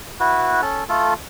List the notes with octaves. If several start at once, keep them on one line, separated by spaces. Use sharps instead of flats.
E4 F#4 B4
C#4 A4
A3 F4 A4